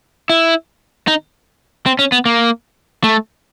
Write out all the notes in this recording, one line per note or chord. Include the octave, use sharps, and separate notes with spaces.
E4
D#4
C4
C#4
B3
A#3
A3